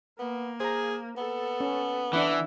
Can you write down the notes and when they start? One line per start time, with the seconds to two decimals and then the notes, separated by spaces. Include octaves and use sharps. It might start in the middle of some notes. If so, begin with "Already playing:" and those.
0.19 A#3 B3
0.60 G#4 C5 A#5
1.17 B3 A4
1.60 C#4
2.13 E3 D4 E4 F#5